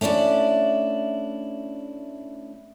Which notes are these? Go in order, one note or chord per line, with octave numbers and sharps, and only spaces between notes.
A3 C#4 D4 E4 D5